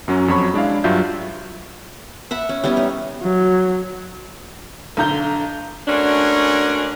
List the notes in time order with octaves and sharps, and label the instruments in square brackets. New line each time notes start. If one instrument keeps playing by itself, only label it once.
[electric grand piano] F#2 F#3 C#4
F2 F#3 C#5 B5 C#6
G#3 D4 E4 F5
G2 F#3 D4 F4 E5 G6
[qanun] E5 F#5 B5
C#4
G3 B3 C#4 E4
D#4
[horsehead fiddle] F#3
[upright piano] B1 D3 A#5 G6 G7
[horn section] G#3 A3 C#4 D4 F#4 A#4